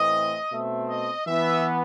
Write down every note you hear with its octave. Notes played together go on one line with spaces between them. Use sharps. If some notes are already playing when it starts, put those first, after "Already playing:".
Already playing: A2 E3 A3 C4 D#5
B2 A3 C4 E5
D#5
E3 B3 E5